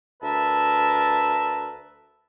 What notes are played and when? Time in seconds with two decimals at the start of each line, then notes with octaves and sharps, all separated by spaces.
0.22 D2 A#4 B4 E5 A5